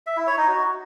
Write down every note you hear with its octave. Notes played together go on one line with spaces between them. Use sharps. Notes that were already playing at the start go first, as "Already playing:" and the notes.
E5
E4
C#5
D#4
F#4